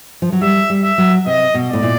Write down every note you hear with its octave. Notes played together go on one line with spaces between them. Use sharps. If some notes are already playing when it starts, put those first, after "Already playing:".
F3
F#3
G3 E5
G3
E5
F#3
C3 D#5
B2
A2 D5
A#2